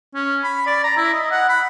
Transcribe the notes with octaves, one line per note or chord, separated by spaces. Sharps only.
C#4
B5
D5
A#5
E4
D#5
F#5
B5